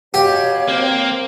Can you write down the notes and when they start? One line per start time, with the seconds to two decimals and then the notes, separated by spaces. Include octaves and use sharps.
0.14 B2 G4 C#5 F5
0.68 A#3 C4